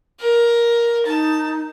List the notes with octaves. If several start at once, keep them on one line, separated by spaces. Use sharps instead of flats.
A#4
D#4 A5